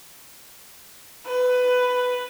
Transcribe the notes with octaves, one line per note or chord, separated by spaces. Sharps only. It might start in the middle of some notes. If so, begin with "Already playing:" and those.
B4